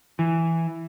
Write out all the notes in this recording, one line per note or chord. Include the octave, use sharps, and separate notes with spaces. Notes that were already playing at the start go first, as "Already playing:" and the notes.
E3